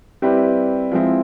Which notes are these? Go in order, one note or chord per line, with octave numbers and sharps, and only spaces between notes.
G3 C4 E4 G4 B4
F3 G#3 C4 E4